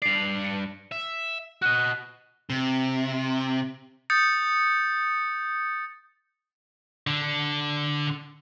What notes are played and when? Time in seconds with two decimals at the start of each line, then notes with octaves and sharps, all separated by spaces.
0.02 G2 D5 C7 F7
0.45 C#7
0.91 E5
1.62 F#4 D#5 F#6
2.50 C3
4.10 D#6 G6 A6 C#7
7.07 D3